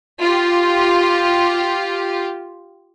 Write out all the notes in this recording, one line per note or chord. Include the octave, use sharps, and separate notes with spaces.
F4 G4